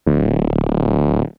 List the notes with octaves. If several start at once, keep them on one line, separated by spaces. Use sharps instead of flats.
D1